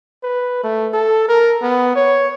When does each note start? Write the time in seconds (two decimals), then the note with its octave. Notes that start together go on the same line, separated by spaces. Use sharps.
0.23 B4
0.63 A3
0.94 A4
1.29 A#4
1.62 B3
1.96 C#5